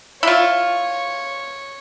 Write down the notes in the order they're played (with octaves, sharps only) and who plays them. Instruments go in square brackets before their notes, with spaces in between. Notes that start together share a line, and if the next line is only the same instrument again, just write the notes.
[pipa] E4 F4 [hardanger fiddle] C#5